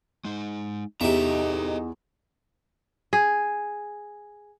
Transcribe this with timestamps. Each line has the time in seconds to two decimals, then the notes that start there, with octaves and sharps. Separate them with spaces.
0.25 G#3 D#4
1.01 E2 D#4 G4 A4 D#5 E5 A#5
3.13 G#4